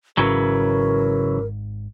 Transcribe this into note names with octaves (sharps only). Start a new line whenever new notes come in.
G#1 G#2 C#3 E3 F#3 A#4